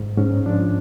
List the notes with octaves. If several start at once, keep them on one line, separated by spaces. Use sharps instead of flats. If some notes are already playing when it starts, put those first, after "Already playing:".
Already playing: G#2
G#2 C#4
F3 D4